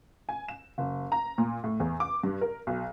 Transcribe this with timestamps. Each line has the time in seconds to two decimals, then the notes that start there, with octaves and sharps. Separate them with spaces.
0.29 G#5
0.48 E7
0.78 F#1
1.12 A#5
1.38 A#2
1.64 A2
1.80 E2
2.00 D6
2.23 G2
2.41 A#4
2.67 B1